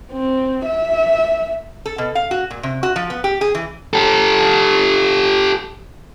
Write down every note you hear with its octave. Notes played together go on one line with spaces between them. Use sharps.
C4
E5
A4
B2
F5
F#4
A#2
C3
F#4
F3
B3
G4
G#4
E3
G4 A4